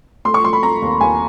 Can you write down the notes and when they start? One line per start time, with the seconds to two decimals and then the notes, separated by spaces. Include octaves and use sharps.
0.25 A3 C6
0.34 C#6
0.44 A3 C6
0.53 B5
0.63 A3 A#5
0.82 D#2
1.01 D#2 G#5